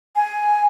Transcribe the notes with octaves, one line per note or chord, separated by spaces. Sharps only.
G#5